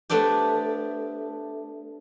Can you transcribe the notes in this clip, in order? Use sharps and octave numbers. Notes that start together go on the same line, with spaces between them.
A3 B3 C4 D4 G4